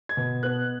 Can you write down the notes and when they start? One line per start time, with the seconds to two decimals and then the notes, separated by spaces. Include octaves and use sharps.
0.09 G#6
0.17 B2
0.43 B3 F#6